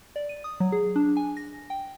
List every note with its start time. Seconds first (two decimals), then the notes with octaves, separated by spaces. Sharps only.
0.16 D5
0.29 D#7
0.44 D#6
0.60 F#3
0.72 G#4
0.96 D4
1.17 G#5
1.37 A#6
1.70 G5